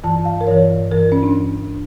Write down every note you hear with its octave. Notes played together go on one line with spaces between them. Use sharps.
G2 E3 A5
F5
A#4
G2 E3 C#5
G2 E3 A#4
C#4
D4